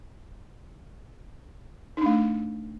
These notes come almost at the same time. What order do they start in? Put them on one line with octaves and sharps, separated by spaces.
D#4 D4 A3